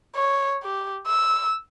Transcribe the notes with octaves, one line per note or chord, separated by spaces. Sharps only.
C#5
G4
E6